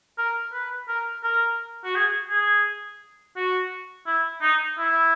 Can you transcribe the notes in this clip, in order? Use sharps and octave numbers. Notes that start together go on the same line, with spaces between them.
A#4
B4
A#4
A#4
F#4
G#4
G#4
F#4
E4
D#4
E4